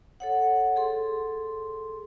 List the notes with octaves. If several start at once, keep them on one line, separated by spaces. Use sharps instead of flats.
A4 C#5 F#5
G#4 A4 C6